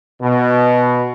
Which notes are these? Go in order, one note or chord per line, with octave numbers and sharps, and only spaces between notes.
B2